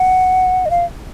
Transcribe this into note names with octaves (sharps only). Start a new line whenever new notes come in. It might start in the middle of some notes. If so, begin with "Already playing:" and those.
Already playing: F#5
D#5
F5